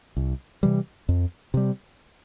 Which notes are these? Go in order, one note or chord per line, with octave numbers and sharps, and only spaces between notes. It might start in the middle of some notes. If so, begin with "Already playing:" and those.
C2
C3 E3 G3
F2
C3 G3